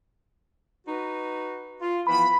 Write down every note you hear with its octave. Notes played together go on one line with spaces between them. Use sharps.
D#4 F#4 B4
F4
E3 F3 B3 B5